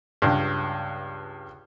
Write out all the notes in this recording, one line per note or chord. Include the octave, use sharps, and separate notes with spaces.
C#2 G2